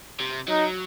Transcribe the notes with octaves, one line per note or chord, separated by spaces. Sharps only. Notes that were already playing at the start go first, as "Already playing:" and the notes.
C3
F#3 D#4